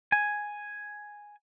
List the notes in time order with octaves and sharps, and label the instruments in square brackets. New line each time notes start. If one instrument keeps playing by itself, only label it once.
[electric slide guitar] G#5